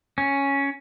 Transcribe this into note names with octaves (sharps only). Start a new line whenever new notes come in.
C#4